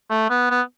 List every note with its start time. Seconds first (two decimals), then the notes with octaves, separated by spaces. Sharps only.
0.10 A3
0.30 B3
0.51 B3